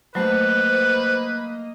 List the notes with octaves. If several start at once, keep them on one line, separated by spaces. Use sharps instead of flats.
F#3 A3 A#3 B4 C5 D#5